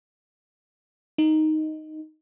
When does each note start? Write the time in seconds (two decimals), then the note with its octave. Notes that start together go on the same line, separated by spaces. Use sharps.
1.18 D#4